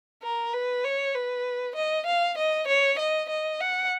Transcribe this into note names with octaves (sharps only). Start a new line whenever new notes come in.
A#4
B4
C#5
B4
D#5
F5
D#5
C#5
D#5
D#5
F#5